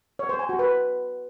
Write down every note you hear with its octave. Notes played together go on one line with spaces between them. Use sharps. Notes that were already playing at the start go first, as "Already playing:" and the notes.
C#5
C5
G#5
F#4
B4